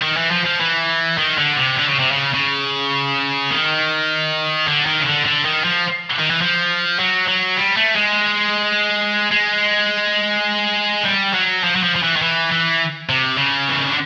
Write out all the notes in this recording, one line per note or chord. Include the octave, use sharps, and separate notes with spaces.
D#3
E3
F3
F3
E3
D#3
D3
C3
D3
C#3
C3
C#3
C#3
D#3
D3
D#3
C#3
D3
D3
D#3
F3
D#3
E3
F3
F#3
F#3
G3
A3
G#3
G#3
G3
F#3
F3
F#3
F3
F3
E3
D#3
E3
E3
C3
C#3
E3
D#3
D3